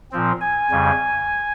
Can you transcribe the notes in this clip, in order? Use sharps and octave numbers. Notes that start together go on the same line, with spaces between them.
A#2 F3 C4
G#5
F2 C#3 G3